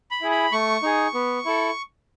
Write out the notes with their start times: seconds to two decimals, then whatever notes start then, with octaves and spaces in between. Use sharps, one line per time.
0.11 B5
0.21 E4 G#4
0.31 B5
0.52 A3 C#6
0.82 D#4 G#4
1.14 B3
1.45 E4 A4